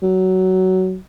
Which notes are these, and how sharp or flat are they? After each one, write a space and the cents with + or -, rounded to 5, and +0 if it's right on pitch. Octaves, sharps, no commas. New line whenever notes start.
F#3 +15